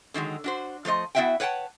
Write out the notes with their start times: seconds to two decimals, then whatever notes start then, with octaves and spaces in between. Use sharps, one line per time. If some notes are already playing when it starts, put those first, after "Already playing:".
0.14 D3 D#3 F#3 G#3
0.44 D4 F#4 C5
0.85 F3 A3 C5 D#5
1.15 B3 E4 F#4 E5 F#5 G5
1.40 B4 C#5 F#5 G5 A5